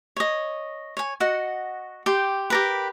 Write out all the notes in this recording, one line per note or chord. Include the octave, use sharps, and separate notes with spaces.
C#5 D#5
C#5 G#5
F#4 D#5 F#5
G4 G5 C6
G4 A#4 B4